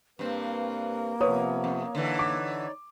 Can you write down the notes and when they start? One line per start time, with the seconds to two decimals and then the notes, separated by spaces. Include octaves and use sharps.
0.19 G2 A#3 C4 B4
1.20 C3 F3 B3 B4 C#5 D#6
1.64 F2
1.95 D3 E3 D#4 C#5 D5
2.19 D6